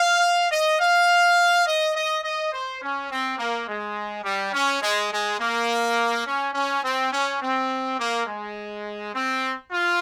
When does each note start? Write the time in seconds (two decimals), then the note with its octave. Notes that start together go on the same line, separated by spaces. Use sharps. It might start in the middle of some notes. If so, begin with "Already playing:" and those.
Already playing: F5
0.50 D#5
0.79 F5
1.66 D#5
1.94 D#5
2.23 D#5
2.52 C5
2.81 C#4
3.10 C4
3.38 A#3
3.67 G#3
4.24 G3
4.52 C#4
4.82 G#3
5.10 G#3
5.39 A#3
6.25 C#4
6.54 C#4
6.83 C4
7.12 C#4
7.41 C4
7.98 A#3
8.26 G#3
9.13 C4
9.71 F4